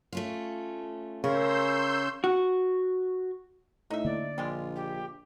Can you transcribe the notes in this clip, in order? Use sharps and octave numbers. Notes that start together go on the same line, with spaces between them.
A3 C#4 F4
C#3 C#4 A#4 C6 E6 G6
F#4
A2 D#4 E5
D3 A#3 D5
A#1 G3 G#3 F4
G4